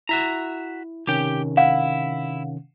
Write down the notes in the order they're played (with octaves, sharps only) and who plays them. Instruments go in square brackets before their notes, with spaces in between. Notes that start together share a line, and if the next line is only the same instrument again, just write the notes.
[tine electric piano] E4 [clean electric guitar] F#4 E5 A#5
[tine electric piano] C3 D#3 C#4 [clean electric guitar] G4 G5
[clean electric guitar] E4 [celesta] F5 F#5